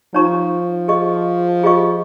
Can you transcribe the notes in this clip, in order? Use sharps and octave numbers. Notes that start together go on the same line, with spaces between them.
F3 D#4 C#5 A#5 C#6
G#4 D#5 C#6
F4 G#4 D#5 C#6